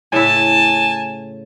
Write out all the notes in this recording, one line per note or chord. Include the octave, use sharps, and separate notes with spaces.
A2 C#3 E4 G#5 A5